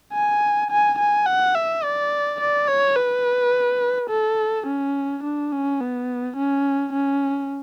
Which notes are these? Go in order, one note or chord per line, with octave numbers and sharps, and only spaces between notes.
G#5
G#5
G#5
F#5
E5
D5
D5
C#5
B4
A4
C#4
D4
C#4
B3
C#4
C#4